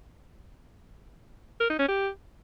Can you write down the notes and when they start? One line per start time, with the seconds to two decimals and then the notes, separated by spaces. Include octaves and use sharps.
1.60 A#4
1.70 D#4
1.79 C#4
1.88 G4